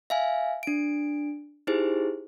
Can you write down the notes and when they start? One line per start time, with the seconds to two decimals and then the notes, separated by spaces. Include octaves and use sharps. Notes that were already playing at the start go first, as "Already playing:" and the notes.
0.10 E5 F5 G#5
0.63 D4 D7
1.67 D#4 E4 G4 G#4 C5